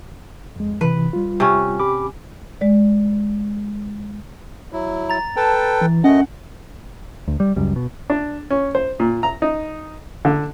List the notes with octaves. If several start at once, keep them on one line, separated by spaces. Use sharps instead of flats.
F2 G#3
C3 E3 B4
G3 F4
C3 C#4
G4 B5 D6
G#3 D5
F#3 E4
A#5 A6
A4 B4 G5 A5
E3
F#2 A3 C#4 D#5 F#5
D2
G3
C#2 F#2 G3
B2
D4
C#4
C5
A#2
A#5
D#4
D3